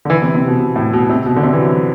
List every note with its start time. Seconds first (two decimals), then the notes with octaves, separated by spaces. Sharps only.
0.05 D3
0.10 E3
0.22 C3
0.35 C3
0.48 B2
0.60 B2
0.76 A2
0.93 B2
1.10 C3
1.26 B2
1.36 D3
1.43 C3
1.53 E3
1.60 F#3